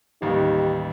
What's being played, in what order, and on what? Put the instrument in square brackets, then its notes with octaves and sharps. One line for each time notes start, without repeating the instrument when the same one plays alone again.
[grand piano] A1 D#2 G3 [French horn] D#4 [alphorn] G4